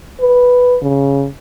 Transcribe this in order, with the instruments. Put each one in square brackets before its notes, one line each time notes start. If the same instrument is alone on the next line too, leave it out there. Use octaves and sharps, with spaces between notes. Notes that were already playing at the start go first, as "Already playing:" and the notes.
[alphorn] B4
C#3